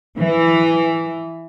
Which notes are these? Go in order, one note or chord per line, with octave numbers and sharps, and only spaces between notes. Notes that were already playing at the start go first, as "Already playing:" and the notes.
E3